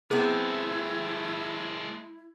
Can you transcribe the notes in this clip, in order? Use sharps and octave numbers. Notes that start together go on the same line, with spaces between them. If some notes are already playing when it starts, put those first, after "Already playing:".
C3 G#3 B3 C4 E4 G#4 A4